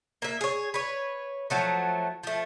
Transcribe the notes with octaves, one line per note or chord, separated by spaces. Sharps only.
A#3 E5
G#4 C#5
B4 C#5
F3 F#3 A3
F3 A3